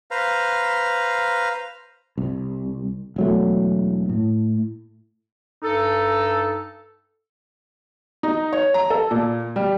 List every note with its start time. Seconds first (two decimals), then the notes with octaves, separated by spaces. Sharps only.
0.11 B4 C5 F5 A#5
2.18 C2
3.16 E1 F#3 A3
4.09 A2
5.62 G2 D#4 A4
8.23 D#4
8.53 C#5
8.74 A#5
8.90 A4
9.11 A#2
9.56 G3